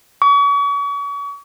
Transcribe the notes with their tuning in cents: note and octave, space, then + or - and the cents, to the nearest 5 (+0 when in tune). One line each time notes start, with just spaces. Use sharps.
C#6 +40